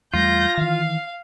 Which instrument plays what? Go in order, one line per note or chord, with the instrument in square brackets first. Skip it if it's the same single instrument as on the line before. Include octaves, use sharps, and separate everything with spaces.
[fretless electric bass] E2 G3 A3 [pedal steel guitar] F4 [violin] G6 A#6
[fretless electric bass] D#3 E3 [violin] F5